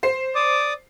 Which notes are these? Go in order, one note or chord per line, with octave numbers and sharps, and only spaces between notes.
C5 C7
D5 D6 D#6